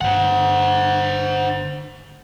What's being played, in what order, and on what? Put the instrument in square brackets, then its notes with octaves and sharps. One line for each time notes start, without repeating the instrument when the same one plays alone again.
[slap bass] G1 G2 [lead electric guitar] C5 F#5